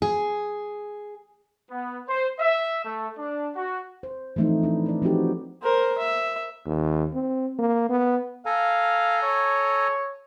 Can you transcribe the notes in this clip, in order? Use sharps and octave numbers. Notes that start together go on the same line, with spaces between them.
G#4
B3
C5
E5
A3
D4
F#4
C5
E3 F3 A3 C4 D#4
D4 E4
B4 D5
F3 C4 D#4 F#4 G4 A4
A#4 C5
E5
D#2
C4
A#3
B3
A4 F5 G#5 A#5
C#5